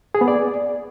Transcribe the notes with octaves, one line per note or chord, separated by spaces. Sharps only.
G#4
B3
D5